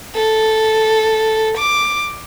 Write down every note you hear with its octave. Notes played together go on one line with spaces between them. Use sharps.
A4
D6